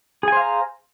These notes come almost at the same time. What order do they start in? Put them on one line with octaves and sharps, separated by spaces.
G#4 G#5 C5 F5 A#5